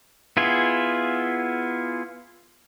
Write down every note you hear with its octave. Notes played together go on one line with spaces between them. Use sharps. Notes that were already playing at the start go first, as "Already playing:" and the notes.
B3 E4 F4 G#4